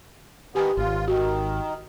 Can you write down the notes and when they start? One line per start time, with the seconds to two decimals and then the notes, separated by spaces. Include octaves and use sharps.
0.55 D#3 B3 G4 G#5
0.77 G#1 F4
1.08 D#3 F#4